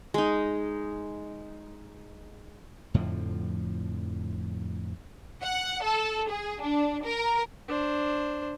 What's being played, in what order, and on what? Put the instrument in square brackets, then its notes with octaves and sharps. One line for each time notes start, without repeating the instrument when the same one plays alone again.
[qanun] G#3 D#4
[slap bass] F2 A2 D3 F3
[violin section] F#5
A4
G#4
D4
A#4
[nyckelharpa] D4 C5